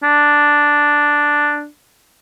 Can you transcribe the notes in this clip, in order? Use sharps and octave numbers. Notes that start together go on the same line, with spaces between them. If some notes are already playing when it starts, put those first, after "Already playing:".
D4